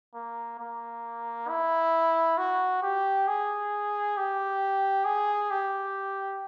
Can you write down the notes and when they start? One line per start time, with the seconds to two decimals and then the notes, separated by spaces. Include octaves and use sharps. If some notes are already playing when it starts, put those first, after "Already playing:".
0.15 A#3
0.60 A#3
1.49 E4
2.38 F#4
2.83 G4
3.28 G#4
4.17 G4
5.05 G#4
5.51 G4